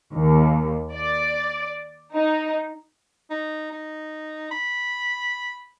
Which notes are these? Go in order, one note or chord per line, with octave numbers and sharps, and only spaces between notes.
D#2
D5
D#4
D#4
D#4
B5